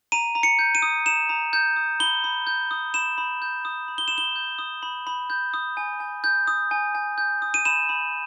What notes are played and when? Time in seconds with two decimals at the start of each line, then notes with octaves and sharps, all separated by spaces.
0.12 A#5 D#7
0.35 A#5
0.43 C#7
0.59 G6
0.75 D#7
0.82 D#6
1.06 A#5 E7
1.29 A#5
1.53 G6
1.76 D#6
2.00 B5 G7
2.24 B5
2.47 G6
2.71 D#6
2.94 B5 E7
3.18 B5
3.42 G6
3.65 D#6
3.88 B5
3.98 G7
4.08 B5 E7
4.18 G7
4.36 G6
4.59 D#6
4.83 B5
5.07 B5
5.30 G6
5.54 D#6
5.77 G#5
6.00 G#5
6.24 G6
6.47 D#6
6.71 G#5
6.95 G#5
7.18 G6
7.42 D#6
7.54 D#7
7.65 B5 E7
7.89 B5